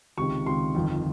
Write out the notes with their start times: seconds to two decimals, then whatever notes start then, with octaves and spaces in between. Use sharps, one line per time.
0.17 C#2 C3 D#3 C#6
0.46 C#2 C3 D#3 C6
0.75 G1 F2 D#3